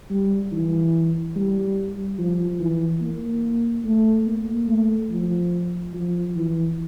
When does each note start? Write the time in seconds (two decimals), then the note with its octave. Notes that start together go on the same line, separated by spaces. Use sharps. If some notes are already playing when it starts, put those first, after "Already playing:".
0.10 G3
0.52 E3
1.36 G3
2.19 F3
2.60 E3
3.01 A#3
3.85 A3
4.27 A#3
4.68 A3
5.11 F3
5.94 F3
6.35 E3